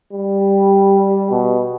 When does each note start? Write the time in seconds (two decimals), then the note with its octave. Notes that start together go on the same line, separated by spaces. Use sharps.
0.13 G3
1.31 B2